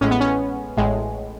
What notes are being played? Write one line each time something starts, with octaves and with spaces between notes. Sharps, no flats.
A1 A2 G#3 C#4
B3
C#4
A1 A2 G#3